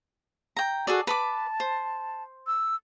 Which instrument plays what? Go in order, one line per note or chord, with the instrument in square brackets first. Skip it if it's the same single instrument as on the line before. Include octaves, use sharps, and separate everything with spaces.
[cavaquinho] G5 A#5
[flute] F#4 [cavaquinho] G#4 A4 D5
[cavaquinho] B4 B5 D6 [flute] A5
[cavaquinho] C5
[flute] E6